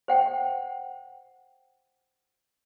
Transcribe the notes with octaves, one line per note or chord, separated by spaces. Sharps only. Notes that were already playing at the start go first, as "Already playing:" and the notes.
C5 F#5 G5